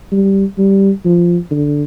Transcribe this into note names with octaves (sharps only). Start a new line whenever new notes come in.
G3
G3
F3
D3